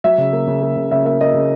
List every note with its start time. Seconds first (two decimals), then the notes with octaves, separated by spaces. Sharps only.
0.04 F#3 E5
0.18 C#3
0.33 A#3
0.47 C#3
0.62 A#3
0.77 C#3
0.91 C#3 E5
1.05 A#3 E5
1.21 A#3 D#5
1.34 C#3